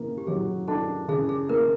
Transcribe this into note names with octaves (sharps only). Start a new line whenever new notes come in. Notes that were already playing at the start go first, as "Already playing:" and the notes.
Already playing: C#3 A#3
G4
F#3 G#4
D4 A4
C#3 G#4
G#4
A#3 A#4